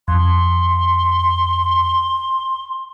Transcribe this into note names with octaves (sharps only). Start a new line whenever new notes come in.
F2 C6